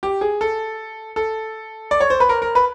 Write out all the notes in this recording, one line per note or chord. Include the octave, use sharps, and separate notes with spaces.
G4
G#4
A4
A4
D5
C#5
C5
B4
A#4
A#4
B4